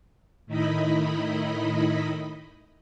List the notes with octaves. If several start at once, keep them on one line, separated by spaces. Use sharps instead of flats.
A2 D#3 D#4 E4 D#5 B5